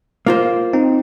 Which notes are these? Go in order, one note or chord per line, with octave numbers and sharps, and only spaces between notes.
A#3 F4 C5
C4 D#4